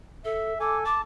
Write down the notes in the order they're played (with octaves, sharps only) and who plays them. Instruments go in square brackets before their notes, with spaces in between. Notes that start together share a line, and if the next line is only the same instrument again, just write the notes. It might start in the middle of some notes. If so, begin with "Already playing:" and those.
[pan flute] A4 [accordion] E5
[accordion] A4 G#5 [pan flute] D6
[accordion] A5 [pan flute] D6